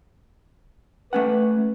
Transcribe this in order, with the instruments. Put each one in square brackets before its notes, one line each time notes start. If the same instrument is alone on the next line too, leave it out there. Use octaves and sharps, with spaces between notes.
[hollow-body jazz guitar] A3 C#4 F#5 [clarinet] B4